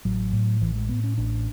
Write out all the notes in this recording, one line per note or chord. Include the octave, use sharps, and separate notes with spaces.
A1 F#3
A2
A1 E3
G#3
A2 B3
C#4
A1 D4